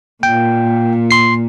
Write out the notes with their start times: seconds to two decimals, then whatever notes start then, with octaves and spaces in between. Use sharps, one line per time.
0.23 A#2 G5
1.11 C6 C7